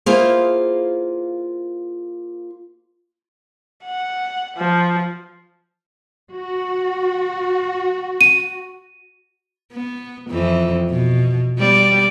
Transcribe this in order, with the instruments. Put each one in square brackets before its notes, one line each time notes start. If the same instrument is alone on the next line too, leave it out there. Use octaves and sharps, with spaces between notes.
[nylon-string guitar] A#3 E4 F4 G#4 C5
[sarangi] F#5
F3
[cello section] F#4
[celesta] D#7
[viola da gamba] B3
F2 E3
B2
G3 B3 D5